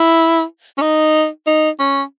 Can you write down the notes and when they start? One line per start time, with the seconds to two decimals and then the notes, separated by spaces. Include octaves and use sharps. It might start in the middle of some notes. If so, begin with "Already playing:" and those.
Already playing: E4
0.78 C#4
0.81 D#4
1.47 D#4
1.80 C#4